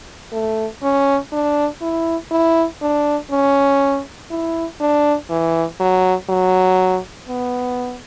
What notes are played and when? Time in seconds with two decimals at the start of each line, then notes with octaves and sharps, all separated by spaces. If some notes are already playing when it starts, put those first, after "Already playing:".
0.32 A3
0.83 C#4
1.32 D4
1.82 E4
2.31 E4
2.82 D4
3.31 C#4
4.31 E4
4.80 D4
5.30 E3
5.80 F#3
6.29 F#3
7.29 B3